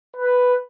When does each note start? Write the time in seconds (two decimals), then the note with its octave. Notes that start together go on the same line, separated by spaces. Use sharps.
0.17 B4